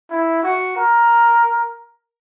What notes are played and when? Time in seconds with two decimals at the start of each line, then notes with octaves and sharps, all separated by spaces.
0.11 E4
0.43 F#4
0.76 A#4